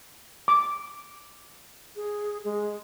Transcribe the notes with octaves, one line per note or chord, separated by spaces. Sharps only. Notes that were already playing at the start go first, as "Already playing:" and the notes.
D6
G#4
G#3